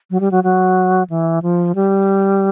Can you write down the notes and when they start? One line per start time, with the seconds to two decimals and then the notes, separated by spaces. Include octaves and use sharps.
0.11 F#3
0.20 G3
0.31 F#3
0.44 F#3
1.10 E3
1.42 F3
1.75 G3